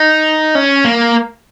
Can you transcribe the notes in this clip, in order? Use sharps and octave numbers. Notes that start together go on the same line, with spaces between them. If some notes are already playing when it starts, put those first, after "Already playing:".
Already playing: D#4
C#4
A#3